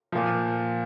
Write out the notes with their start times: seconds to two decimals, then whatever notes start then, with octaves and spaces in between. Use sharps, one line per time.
0.12 A#2 F3